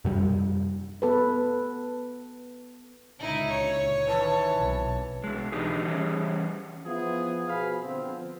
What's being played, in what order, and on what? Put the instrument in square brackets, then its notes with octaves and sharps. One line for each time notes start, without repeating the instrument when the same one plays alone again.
[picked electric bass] F#2 C3 G3
[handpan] B3 A4 B4
[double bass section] C#2 A#2 D3 [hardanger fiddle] D#4 E4
[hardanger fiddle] C#5
[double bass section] D#3 [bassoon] E3 [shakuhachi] A5
[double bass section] B1 C3
[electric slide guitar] B2 G#3
E3 D4 D#4 G4 G#4
E3 G3 C#4 G#4
[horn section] F3 B3 E4 F4 G#4
B2 F3 G#4 B4 F5 B5
D3 F3 B3 C4